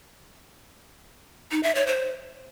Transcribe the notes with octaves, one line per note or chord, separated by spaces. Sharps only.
D#4
E5
C#5
C5